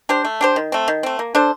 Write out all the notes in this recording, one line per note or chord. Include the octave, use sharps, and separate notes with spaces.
D4 G4 C5
A3
D4 G4 C5
D#3
A3 C4
D#3
A3 C4
A#3
D4 A4 C5